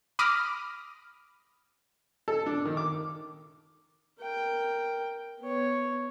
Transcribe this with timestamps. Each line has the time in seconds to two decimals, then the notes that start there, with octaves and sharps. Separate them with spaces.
0.19 B5 D6 D#6 F6 A#6
2.28 A4
2.46 D4
2.65 D#3
2.77 D6
4.20 A#4 G5
5.40 B3 C#5